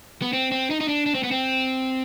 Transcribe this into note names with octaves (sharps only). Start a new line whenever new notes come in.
B3
C4
C4
D#4
D#4
D4
D4
C4
B3
C4